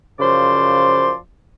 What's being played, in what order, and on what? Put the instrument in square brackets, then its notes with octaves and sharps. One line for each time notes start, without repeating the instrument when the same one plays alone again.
[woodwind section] F#2 C#3 F3 C5 D5 C6